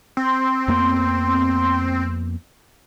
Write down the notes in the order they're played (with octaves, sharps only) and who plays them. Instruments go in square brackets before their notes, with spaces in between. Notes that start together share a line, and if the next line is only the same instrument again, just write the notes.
[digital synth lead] C4 [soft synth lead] C6
[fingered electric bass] F2 A#3 B3